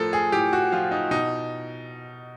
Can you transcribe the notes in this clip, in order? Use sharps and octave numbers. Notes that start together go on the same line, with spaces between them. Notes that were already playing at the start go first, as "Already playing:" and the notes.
Already playing: A2 F3 A4 A#4
G#4
A2 G4
F#4
F3 F4
D#4
B2 D#4